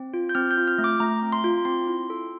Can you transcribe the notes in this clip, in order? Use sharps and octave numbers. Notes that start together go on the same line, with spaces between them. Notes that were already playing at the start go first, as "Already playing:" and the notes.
Already playing: C4
F4
G6
C4 F6
G6
F4
F6
A3
D6
A3 A#5
C4
C6
F4
C4 C6
E4
A4